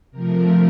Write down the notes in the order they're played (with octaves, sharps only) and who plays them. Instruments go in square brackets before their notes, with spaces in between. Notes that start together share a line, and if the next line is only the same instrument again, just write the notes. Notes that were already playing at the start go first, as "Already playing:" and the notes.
[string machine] C3 F3 A3 A#4